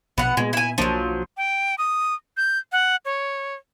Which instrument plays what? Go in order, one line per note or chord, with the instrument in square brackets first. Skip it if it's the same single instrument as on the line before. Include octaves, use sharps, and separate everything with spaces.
[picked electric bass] A#1 B2 [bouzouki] B3 F#5
[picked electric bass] A#2 B3 [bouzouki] G#3
[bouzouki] E4 G#5
[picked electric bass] B1 A#3 D4 [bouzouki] F3 F#3
[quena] G5
D#6
G6
F#5
C#5